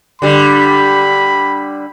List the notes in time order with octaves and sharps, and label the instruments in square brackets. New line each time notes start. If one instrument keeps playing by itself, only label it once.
[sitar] D3 G3 [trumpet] B5